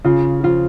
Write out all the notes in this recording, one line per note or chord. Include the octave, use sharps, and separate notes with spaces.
C#3 F4
F3 F4